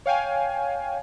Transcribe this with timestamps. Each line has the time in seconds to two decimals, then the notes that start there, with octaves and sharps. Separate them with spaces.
0.06 C#5 F5 G5 G#5